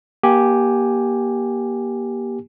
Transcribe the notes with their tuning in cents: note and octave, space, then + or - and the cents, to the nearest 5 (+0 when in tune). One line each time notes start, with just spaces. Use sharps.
A#3 +30 G4 +0 G#5 +0